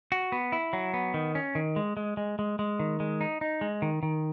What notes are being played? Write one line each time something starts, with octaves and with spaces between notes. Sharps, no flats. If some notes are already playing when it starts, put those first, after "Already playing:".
F#4
B3
E4
F#3
B3
D#3
C#4
D#3
G#3
G#3
G#3
G#3
G#3
D#3
G#3
D#4
D#4
G#3
D#3
D#3